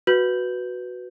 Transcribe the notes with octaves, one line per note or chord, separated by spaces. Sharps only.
F#4 B4 G6 F#7